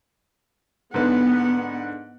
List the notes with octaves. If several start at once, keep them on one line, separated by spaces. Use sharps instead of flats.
G#2 D3 B3 B4 F#5